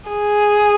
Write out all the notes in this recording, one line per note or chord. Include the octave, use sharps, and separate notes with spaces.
G#4